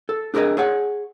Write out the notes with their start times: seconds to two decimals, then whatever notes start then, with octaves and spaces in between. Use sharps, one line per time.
0.09 A4
0.34 D4 G#4 A#4 C5 D#5
0.57 G#4 C#5 F#5